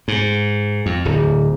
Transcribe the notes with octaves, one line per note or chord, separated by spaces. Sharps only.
G#2
F2
D1